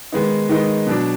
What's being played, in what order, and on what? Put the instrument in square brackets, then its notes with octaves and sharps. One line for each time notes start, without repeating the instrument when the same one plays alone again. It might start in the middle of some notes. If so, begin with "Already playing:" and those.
[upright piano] D#3 G#3 B3 D#4
D#3 G#3 B3 D#4
B2 F#3 D4